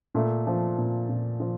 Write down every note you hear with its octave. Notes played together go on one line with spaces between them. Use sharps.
A#2 A3
F3
A#2
A#2
F3